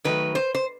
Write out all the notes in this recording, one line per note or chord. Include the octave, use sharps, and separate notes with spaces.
D#3 F#3 A3 B4
C5
C5